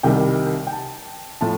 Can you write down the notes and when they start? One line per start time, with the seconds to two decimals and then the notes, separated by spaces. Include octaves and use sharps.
0.03 C2 C3 D#3 G3 G5
0.67 G5
0.72 A5
1.41 A2 F3 A5